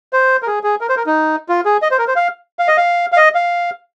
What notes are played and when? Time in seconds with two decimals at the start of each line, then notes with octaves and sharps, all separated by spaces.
0.13 C5
0.42 A#4
0.47 G#4
0.63 G#4
0.81 A#4
0.89 C5
0.97 A#4
1.06 D#4
1.49 F4
1.65 G#4
1.82 D#5
1.91 C5
1.99 A#4
2.08 C5
2.16 F5
2.59 F5
2.68 D#5
2.77 F5
3.12 F5
3.17 D#5
3.35 F5